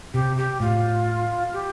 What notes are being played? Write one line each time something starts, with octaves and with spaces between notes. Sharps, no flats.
C3 G4
G4
A2 F4
G4